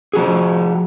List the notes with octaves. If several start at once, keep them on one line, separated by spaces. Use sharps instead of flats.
F3 F#4 G#4